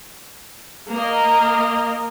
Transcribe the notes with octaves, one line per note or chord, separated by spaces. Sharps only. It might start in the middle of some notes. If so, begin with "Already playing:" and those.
A#3 A#4 D#5